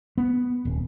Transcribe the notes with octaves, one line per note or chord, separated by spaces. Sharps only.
B3
D#1